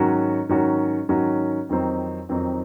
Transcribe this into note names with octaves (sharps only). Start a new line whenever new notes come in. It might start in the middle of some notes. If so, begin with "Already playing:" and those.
Already playing: G#2 D#3 F#3 C#4 F#4
G#2 D#3 F#3 C#4 F#4
G#2 D#3 F#3 C#4 F#4
F2 D#3 F#3 C4 D#4
F2 D#3 F#3 C4 D#4